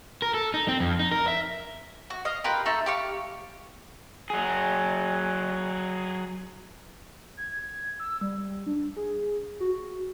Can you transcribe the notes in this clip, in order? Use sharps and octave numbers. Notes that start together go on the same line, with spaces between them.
A#4
A4
D#4
C4
F2
D#4
A#4
E5
F#4
D#5 F5
F4 G4 A#4 B4
A3 D#4 A4 C#6
G4 F5 C#6
F#3 G#4
G#6
E6
G3
D4
G#4
F#4